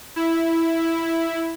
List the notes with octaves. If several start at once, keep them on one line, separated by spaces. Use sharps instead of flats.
E4